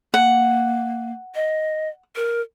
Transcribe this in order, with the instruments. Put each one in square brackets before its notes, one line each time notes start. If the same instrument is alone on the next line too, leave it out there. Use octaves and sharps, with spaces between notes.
[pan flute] A#3 [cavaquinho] F#5
[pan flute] D#5
A#4